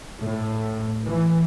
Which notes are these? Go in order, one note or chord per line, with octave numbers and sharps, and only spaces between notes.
A2
E3